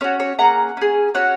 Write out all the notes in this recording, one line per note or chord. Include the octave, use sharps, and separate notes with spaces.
C#4 F#4 C#5
C#5
A#3 C#4 G#4 F#5 A#5
C#4 G#4
C#4 F#4 C#5 F#5